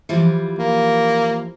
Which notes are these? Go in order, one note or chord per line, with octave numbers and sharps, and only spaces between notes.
E3 F3 G3
A#3